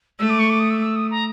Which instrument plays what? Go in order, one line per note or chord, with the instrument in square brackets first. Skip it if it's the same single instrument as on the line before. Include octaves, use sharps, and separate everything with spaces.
[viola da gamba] A3 [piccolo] E6
[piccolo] D6
C#6
D6
D#6
E6
E6
D#6
A#5